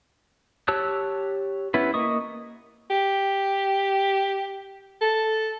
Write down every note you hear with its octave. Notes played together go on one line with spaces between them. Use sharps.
G4 C#5 A5 E6 F#6
B3 C#4 E4 B4
A#3 D#5 C#6 D#6
G4
A4